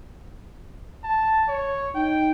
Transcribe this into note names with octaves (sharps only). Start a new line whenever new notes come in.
A5
C#5
D#4 G5